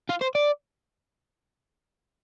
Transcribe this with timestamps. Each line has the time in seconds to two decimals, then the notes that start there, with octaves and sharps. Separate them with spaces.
0.10 F4
0.22 C5
0.35 D5